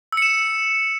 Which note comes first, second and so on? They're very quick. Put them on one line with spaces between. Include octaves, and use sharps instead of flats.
E6 C#7 E7